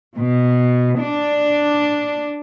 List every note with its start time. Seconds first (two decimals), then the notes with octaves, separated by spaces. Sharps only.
0.17 B2
1.03 D4